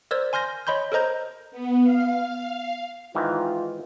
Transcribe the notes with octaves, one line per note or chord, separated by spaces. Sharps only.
A#4 C5 D5 E6 G#6
G#5 C6 F6 G6 A#6
C#5 D#5 B5 C6 G6
A4 A#4 C5 D#5 A#5 G6
B3
F5
G#2 D#3 E3 F4